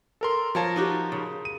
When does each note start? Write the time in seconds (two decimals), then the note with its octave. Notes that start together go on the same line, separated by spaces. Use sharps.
0.21 A4 A#4 C6
0.55 F3 F4 A#4 C#5 A5
0.76 D#4 F#4 G4
1.12 C#3
1.45 D#7